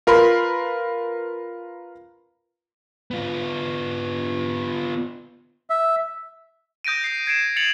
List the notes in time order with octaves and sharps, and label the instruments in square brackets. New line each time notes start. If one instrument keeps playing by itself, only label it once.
[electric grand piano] F4 A#4 B4 B5 C6
[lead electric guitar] B3 F4
[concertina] E5
[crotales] D#6 G6 A#6 D7 D#7
G6 C7
G#6 C7 D7 E7
A6 C#7 F7 F#7